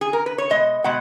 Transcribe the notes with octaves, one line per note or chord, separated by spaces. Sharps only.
G#4
A#4
B4
C#5
B2 G#3 D#5
B2 G#3 F#5